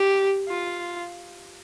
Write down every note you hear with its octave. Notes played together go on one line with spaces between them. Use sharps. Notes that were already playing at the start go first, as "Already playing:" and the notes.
Already playing: G4
F4